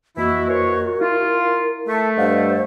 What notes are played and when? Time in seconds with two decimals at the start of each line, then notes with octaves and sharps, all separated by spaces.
0.17 F2 E3 A#3 E4 F#4 D#5
0.49 E3 A#4 C5 C#5
1.01 E4 F4
1.88 A3 A5
2.18 G2 C5 D#5 F5 F#5